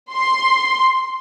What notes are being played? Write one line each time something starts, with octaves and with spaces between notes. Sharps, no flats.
C6